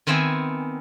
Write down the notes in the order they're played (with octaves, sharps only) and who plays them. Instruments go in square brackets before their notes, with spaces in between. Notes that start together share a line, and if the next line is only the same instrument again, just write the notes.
[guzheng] D#3 B3 C4 E5 G#5